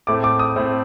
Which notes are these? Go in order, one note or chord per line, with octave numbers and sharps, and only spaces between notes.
A2 A3 C4 D6
D6
D#6
A2 A3 C4